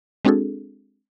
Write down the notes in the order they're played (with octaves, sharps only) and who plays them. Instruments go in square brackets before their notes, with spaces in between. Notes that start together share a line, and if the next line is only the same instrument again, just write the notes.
[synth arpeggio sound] G#3 C4 D4 F#4 G#4 A4